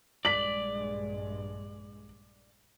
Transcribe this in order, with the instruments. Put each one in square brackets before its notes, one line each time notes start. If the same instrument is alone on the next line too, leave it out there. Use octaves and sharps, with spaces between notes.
[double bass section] A#1 G2 G#3 [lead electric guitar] D5 [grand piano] B6 F#7